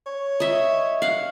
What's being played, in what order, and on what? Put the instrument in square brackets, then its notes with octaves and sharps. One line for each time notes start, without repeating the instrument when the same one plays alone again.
[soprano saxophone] C#5
[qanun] D#5 E5
F5 F#5